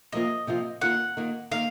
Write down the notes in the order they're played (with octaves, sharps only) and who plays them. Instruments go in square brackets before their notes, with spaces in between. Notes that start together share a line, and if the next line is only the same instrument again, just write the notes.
[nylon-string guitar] C3 F3 A#3 F4 [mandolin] D#5
[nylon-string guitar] C3 F3 A#3 F4
[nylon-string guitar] D#3 A#3 F4 [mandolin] F#5
[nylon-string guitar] D#3 A#3 F4
[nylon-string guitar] D#3 A#3 [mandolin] F5